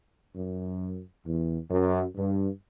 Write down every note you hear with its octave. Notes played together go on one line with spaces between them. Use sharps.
F#2
E2
F#2
G2